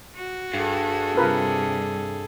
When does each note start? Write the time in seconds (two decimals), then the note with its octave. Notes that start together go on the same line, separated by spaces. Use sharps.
0.16 F#4
0.54 G2 G#4 A4
1.17 C3 G3 F4 A#4 B4